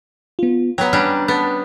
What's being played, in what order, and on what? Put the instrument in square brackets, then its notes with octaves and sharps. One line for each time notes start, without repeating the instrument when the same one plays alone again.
[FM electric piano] B3 F4
[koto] F#3 B3 [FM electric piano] G5 A#5 B5
[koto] G3 C#4 D4
[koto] B3 [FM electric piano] A5 A6